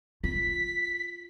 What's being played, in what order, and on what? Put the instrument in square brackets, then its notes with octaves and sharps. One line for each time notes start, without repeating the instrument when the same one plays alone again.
[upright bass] F4 [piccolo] B6